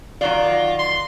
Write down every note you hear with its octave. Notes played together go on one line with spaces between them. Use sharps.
D#3 F#3 F4 D5
C6